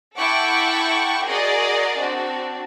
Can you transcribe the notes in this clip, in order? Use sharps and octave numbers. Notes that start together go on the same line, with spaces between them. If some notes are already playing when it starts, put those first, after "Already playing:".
E4 A4 F#5 G5 C#6 D6
F#4 G#4 A#4 D5 D#5
C4 D4 F#4